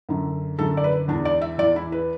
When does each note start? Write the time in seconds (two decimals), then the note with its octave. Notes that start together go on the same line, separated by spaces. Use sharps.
0.09 F#2 D3
0.59 F#2 D3 A4
0.77 D5
0.84 B4
1.08 E2 E3 D4
1.25 D5
1.42 E5
1.58 E2 E3 D5
1.76 E4
1.92 B4